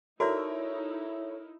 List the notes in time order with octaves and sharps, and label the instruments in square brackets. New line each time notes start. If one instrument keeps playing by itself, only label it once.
[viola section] D#4 E4 [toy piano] F#4 D5 [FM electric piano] A4 C#5 E5 [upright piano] A#4